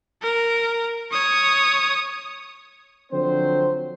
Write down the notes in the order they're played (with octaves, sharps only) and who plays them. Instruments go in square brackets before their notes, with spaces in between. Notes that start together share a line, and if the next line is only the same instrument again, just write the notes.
[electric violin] A#4
C#5 D#6
[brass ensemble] D3 F3 F#3 C4 C5